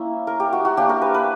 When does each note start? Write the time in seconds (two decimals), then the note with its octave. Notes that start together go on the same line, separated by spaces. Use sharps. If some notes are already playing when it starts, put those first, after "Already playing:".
Already playing: A#3 C#4 E4 E5
0.27 A#4
0.40 G4
0.53 F#4
0.65 F#4
0.77 A#3 D4 G4
0.89 A#4
1.02 B4
1.14 B4